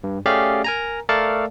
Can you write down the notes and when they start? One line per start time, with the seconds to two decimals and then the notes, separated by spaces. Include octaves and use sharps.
0.04 G2
0.26 A3 C#4 G4 G#4 D5 F5
0.64 A#4 G#5 A#5
1.09 A3 A4 A#4 D5 F5 A5